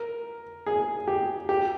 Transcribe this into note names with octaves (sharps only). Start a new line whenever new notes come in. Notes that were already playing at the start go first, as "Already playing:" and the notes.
Already playing: A#4
G#4
G4
G4